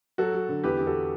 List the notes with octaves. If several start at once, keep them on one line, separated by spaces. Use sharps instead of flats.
F#3 F#4 A4
F#3
D3
E2 G4 B4
E2 G4
F#4 A4